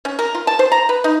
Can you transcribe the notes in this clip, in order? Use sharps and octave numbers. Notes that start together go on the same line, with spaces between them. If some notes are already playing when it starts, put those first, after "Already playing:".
C#4
A#4
F4
A5
C5
A#5
B4
D#4